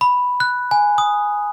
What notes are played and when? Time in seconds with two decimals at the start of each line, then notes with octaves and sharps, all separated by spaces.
0.01 B5
0.40 F#6
0.71 G#5
0.98 D#6